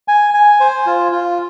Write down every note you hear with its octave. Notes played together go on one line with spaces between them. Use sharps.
G#5
G#5
C5
F4
F4